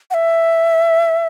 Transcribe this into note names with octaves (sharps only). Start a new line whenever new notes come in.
F#5
E5